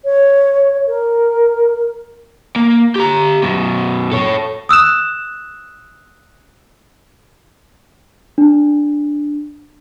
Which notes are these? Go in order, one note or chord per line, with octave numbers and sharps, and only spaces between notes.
C#5
A#4
A#3
G4 A#5
F#2 B2
A4 C#5
D#6 E6 F#6 E7
D4